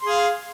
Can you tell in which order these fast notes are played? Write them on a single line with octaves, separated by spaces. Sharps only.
C6 G#4 F5